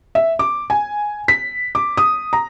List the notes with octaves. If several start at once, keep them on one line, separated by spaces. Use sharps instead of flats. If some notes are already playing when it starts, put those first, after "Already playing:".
E5
D6
G#5
B6
D6
D#6
A#5